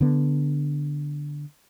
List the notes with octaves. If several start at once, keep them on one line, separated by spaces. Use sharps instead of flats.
D3 B3